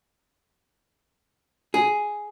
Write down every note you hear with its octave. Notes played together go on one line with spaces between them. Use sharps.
G#4